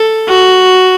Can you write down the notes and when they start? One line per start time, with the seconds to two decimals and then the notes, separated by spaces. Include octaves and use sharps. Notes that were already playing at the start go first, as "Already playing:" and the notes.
Already playing: A4
0.29 F#4